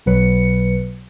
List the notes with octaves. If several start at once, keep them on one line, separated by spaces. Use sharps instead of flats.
B1 B2 F#3 B4 C#7